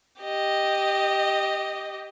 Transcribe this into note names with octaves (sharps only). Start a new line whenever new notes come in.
G4 D#5